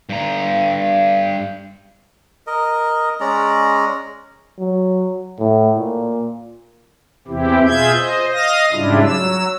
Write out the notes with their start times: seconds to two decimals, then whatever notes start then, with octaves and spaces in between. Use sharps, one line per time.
0.09 G2 A#5
2.47 A#4 D#5
3.20 G#3 C#4 D5 A#5
4.60 F#3
5.40 A2
5.78 A#2
7.28 E2 C3 E3 C4 E4 G4
7.67 B2 F4 G#4 E5 G6 G#6
7.96 C5 D#5
8.33 D#5 F5 D#6 A#6
8.72 G#2 C#3 G3 D4 E4 F4
9.03 F#3 E6